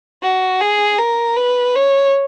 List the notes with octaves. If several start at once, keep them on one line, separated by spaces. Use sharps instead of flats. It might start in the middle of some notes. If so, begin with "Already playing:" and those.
F#4
G#4
A#4
B4
C#5